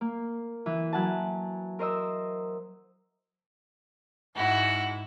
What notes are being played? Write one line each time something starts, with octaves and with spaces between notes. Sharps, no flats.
A#3
E3
F#3 B4 F#5 G#5 A5
A#4 C5 D#5 E6
G#2 E4 F#4